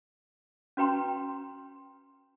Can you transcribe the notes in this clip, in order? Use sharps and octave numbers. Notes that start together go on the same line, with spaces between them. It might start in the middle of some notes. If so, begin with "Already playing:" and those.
C#4 F#4 B4 G5 A#5 C6